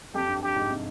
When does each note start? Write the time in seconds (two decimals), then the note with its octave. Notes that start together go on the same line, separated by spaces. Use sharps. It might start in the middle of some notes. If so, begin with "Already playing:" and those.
0.14 F2 G4
0.28 G2
0.43 G2 G4
0.56 G#2
0.71 C3